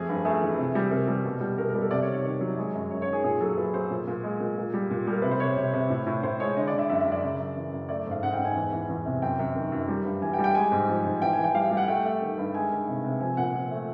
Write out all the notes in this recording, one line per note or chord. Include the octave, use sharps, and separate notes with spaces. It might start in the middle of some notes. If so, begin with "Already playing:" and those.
Already playing: F2 A3 G#4
G2
A3 G#4
E3
C3
G3
C3 A#4
G3
B2
G3
B2 A#4
A#4
G3
A4
C3 D5
C#5
D#3
C#5
D#3 C#5
F#3
G#3
F#2
F#2 C#5
C#5
D#3
G#4
A#2 G#4
F#3 A4
F#3 B4
F#3 C5
A#2
A#2
G#3
A#2
A#2
G3
A#2
G3 A#4
C3 B4
C5
C3 C#5
C3
C3
A2
A2
A2 C5
G#3 C#5
D3 D#5
D5
D3
E5
F#2 E5
E5
F#2
D5
C#3
F#2
E3
F#2
A3 D5
G#2
F5
G#2 F#5
G5
G#2
G#5
E2
E3
E2
C3
F#2 G5
F#2
D#3
F#2
G3
G2
E3 G#5
G5
G3
G5
G#3 G#5
G#2
F3
G#2
E3 G5
G#5
E3
G5
G3 F5
F5
G3
F#5
A3 G5
A3
D#3
G2
G#3 G#5
D#3
C3
C3
F3 G#5
A#2 F#5
F3
A3